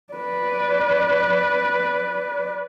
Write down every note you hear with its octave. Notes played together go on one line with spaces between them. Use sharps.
B4 D5